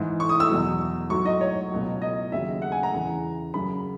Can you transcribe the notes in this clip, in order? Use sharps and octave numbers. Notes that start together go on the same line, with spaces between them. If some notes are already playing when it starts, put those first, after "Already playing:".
Already playing: G#2 E3
C#6
D#6
E6
E2 B2 F#3
G#2 F#3 C#6
D#5
C#5
C#2 B2 F#3
D#5
D#2 C#3 F#3 E5
F#5
G#5
A#5
E2 C#3 E3
F#2 C#3 F#3 B5